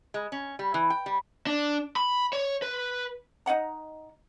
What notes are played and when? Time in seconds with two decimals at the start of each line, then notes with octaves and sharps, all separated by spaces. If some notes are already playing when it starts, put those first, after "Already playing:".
0.14 G#3
0.32 C#4
0.59 G3
0.74 E3
0.90 G5
1.06 G3
1.47 D4
1.96 B5
2.33 C#5
2.62 B4
3.46 D#4 D#5 F#5 A#5